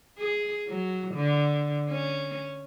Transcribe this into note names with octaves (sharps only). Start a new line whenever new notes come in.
G#4
F#3
D3
C#4